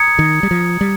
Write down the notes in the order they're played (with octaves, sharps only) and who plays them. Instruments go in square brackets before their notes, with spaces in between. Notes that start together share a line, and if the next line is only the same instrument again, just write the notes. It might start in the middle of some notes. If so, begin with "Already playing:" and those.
Already playing: [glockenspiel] A#5 D#6 G#6 C#7
[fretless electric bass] D#3
G3
F3
G3